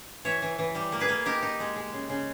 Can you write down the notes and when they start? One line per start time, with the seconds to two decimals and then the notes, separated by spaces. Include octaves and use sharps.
0.25 E3 C#5 E5
0.42 E3
0.59 E3
0.75 G3
0.92 A#3
1.00 G#4 B4
1.09 A#3
1.26 D#4 G4 A#4
1.42 D#4
1.60 G#3
1.76 G#3
1.93 C#3
2.10 C#3